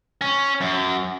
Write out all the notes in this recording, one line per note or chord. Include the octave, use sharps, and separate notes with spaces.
C#4
F#2